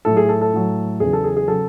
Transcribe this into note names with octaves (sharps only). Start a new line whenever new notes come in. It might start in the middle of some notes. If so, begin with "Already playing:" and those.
A2 F#3 A4
G#4
A4
A4
A2 F#3
E2 C#3 F#3 G#4
A4
G#4
G#4
C#3 F#3 A4